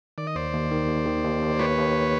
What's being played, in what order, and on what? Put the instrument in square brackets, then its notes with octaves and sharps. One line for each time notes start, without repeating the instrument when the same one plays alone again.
[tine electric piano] D#3 [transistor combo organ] D5
[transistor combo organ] D#5
[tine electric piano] D#2 [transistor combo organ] C5 D5
[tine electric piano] D#2
D#3
D#2
D#3
D#2
D#2
[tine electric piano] D#2 [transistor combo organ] B4 C#5
[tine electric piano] D#2